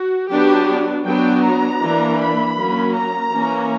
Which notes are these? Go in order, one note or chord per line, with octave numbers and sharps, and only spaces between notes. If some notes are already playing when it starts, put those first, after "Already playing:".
Already playing: F#4
F#3 B3 D4 G4
F#3 B3 D4 G5
A#5
E3 A#3 D4
B5
F#3 A#3 C#4
A#5
E3 A#3 C#4